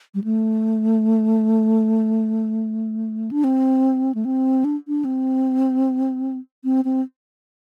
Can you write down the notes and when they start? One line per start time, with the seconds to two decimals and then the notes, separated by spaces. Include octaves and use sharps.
0.15 G3
0.24 A3
3.31 D4
3.44 C4
4.15 A3
4.25 C4
4.64 D4
4.88 D4
5.05 C4
6.64 C4
6.85 C4